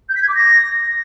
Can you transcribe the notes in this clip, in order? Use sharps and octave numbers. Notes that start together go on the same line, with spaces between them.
G6
B6
G#6
D6
A#6